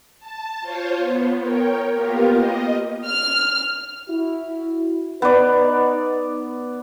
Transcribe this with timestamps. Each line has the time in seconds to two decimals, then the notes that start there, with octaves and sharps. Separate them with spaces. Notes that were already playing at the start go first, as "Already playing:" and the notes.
0.19 A5
0.61 F4 C5 C#5
0.96 B3
1.41 A#4 C#5 G5
1.94 A#3 B3 F4 G4 A#4
2.30 D#5
3.08 F6
4.09 E4 F#4
5.22 B3 D#4 B4 D5